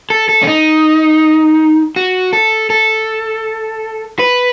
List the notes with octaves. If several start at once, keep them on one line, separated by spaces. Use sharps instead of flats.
A4
A4
C#4
D#4
F#4
A4
A4
B4